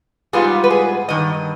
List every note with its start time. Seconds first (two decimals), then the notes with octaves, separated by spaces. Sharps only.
0.33 G#2 G3 B3 F4 G#4
0.64 B4
0.70 G#4
1.09 G2 D#3 D#5